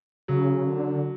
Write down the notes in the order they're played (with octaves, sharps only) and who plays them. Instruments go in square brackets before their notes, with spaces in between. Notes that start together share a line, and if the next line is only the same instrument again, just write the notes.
[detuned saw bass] C#3 [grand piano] F#3
[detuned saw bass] D3